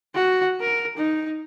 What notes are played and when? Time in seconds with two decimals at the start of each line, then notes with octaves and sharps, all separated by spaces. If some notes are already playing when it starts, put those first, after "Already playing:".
0.15 F#4
0.61 A#4
0.97 D#4